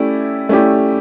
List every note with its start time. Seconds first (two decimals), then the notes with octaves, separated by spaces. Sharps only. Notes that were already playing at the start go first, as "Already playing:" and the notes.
Already playing: A3 C#4 E4 G4 D5
0.49 A3 C#4 E4 G4 D5